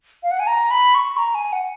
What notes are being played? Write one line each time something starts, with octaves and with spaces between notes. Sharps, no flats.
F5
F#5
G#5
A#5
B5
C#6
A#5
G#5
F#5